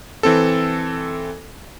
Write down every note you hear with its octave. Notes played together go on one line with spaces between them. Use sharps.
E3 C4 A4